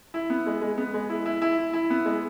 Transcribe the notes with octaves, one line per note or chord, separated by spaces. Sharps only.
E4
B3
G#3
G#3
B3
G#3
E4
E4
E4
E4
E4
B3
G#3